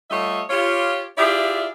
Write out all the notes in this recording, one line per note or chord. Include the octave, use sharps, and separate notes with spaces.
G3 A3 F4 C#5 D#5 E5
F4 G4 C#5
E4 F4 G4 G#4 D5 E5